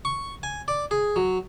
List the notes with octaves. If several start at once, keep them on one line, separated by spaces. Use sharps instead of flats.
C#6
G#5
D5
G#4
F#3